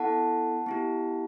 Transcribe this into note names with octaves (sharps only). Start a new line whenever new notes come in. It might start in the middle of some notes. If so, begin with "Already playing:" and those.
Already playing: B3 E4 A4 F#5 A5
B3 E4 G4